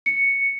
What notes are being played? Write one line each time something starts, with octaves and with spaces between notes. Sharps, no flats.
C#7